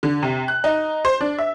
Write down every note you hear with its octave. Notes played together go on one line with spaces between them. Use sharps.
D3
C3
F#6
D#4
C5
D4
E5